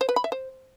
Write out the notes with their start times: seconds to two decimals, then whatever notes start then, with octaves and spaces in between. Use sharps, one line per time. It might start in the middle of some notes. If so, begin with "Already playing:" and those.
0.01 C5
0.09 B4
0.16 B5
0.24 E5
0.32 C5